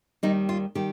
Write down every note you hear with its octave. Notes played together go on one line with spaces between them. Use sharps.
D#2 D#3 G3 D#4
F4
D#3 G3 G4